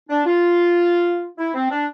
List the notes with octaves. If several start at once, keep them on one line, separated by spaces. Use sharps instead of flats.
D4
F4
E4
C4
D4